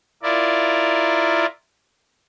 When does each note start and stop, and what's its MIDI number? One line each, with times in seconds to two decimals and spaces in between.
0.23 1.46 64
0.23 1.46 65
0.23 1.46 70
0.23 1.46 74